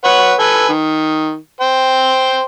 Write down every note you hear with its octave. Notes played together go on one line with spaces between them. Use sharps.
B4 C#5 F#5
A4 B4 G#5
D#3
C5 G5